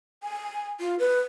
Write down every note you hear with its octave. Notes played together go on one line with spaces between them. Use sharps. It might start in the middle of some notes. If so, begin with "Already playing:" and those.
G#5
F4
B4